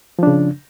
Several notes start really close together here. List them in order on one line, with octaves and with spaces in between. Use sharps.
F3 D4 C#3